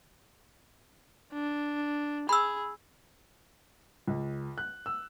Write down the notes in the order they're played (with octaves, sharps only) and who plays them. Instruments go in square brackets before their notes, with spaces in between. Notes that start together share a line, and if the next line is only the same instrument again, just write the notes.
[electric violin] D4
[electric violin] G#4 [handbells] B5 E6
[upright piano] C#2
F#6
E6